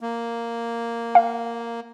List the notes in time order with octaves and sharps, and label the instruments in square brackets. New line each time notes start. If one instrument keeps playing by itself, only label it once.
[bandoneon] A#3
[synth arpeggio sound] F5